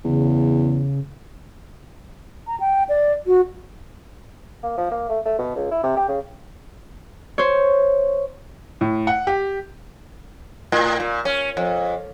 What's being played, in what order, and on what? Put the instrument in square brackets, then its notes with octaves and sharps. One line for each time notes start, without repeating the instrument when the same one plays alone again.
[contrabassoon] E2 [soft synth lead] C#3
[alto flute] A#5
G5
D5
F#4
[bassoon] A#3
F3
A#3
A3
A3
B2
C#2
E4
C3
G4
C#3
[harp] C5 C#5
[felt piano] A2
F#5
G4
[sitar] A2
A#2
C#4
F2